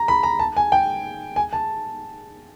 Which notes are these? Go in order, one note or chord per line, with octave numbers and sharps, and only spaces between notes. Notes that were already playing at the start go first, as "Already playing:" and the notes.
Already playing: A#5
B5
A#5
A5
G#5
G5
G#5
A5